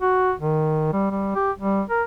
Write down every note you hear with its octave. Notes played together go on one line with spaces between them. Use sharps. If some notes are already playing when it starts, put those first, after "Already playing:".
F#4
D#3
G3
G3
G4
G3
A#4